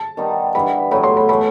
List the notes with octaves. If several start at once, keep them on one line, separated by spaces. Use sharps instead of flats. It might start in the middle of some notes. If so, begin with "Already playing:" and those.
Already playing: A5
D#3 G3 B3 D#4
G2 E3 B3 B5
A2 F#3 B3 B5
C6
B5
E3 A3 B5